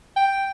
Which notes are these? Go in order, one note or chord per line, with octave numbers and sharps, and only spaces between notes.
G5